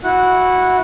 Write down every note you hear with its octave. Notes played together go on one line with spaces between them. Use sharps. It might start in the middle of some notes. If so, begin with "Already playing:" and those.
E4 F#4 F#5